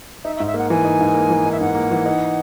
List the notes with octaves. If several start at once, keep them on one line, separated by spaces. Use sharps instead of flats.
D#4 E5
E5
G#2
E5
A#3 F#5
E3 G#5
D#4
G#2
A#3
E3
D#4
E5
G#2 F#5
A#3
E3
D#4